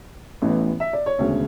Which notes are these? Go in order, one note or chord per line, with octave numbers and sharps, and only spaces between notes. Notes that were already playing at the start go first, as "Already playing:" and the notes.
A1 A2 E3 B3
E5
D5
C#5
E1 D2 C#3